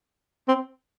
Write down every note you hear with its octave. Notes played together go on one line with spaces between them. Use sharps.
C4